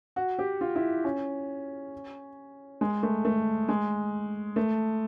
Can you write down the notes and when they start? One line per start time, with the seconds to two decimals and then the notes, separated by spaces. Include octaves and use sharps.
0.16 F#4
0.39 G4
0.61 F4
0.76 E4
1.04 C#4
2.81 G#3
3.03 A3
3.25 A3
3.68 G#3
4.56 A3